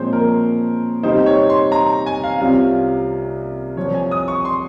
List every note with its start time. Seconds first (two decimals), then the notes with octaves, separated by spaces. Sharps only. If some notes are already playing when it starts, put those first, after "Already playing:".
Already playing: A#2 F3 G#3 C4 C5 C#5
0.13 A#4
1.03 C3 G3 C4 D#4 C5
1.26 C#5
1.49 C6
1.72 A#5
2.06 G#5
2.23 F5
2.41 C2 C3 G3 C#4 F4 F5
3.77 C2 C3 F3 C#5
3.94 G#5
4.11 D#6
4.28 C#6
4.45 C6